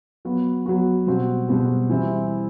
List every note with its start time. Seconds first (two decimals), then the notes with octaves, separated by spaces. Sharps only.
0.25 F#3 B3 F#4
0.66 F#3 B3 F#4
1.07 B2 G3 C4 F#4
1.48 B2 G3 C4 F#4
1.89 E3 G3 C4 E4